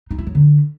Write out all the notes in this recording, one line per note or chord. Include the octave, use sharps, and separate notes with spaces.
D#4
E4
F#3
D3